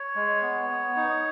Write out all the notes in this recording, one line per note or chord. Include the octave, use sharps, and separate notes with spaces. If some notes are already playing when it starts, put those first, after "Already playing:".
Already playing: C#5
G#3
B3
B3
D#4